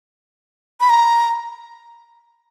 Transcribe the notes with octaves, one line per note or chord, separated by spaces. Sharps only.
B5
A#5